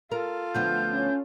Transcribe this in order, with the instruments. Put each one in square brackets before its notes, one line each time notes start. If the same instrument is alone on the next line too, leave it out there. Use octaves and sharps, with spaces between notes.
[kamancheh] F4 A4 [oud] A#4
[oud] D2 F3 B3 [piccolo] G6
[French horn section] C#4